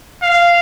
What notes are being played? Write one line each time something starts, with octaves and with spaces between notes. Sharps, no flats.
F5